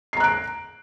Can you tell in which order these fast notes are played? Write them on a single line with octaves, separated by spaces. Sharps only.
C7 A#5 F#6 D7